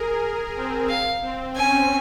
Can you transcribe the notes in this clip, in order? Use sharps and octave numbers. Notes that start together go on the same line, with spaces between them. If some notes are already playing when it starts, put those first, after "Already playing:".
Already playing: G#4 A#4
C4
F5
C4
C#4 G#5